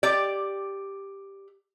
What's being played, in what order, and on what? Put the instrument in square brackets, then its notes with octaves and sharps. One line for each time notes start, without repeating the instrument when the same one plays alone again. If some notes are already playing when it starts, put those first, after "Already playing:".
[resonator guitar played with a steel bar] G4 D5